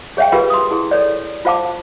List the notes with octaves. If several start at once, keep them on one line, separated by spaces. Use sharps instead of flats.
G#4 C#5 E5 F5 G5
F4 G4 G#4 A#4 B4 F5
C6 D#6
E4 G#4
A4 C#5 D5
F4 C5 F5 A5 D6